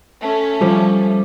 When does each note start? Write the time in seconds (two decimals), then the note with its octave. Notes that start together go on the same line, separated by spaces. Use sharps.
0.22 A3 C#4
0.61 F3 G3